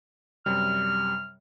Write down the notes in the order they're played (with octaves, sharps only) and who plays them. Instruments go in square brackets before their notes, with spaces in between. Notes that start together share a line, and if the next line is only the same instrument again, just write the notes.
[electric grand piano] F#2 C3 G3 [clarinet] F6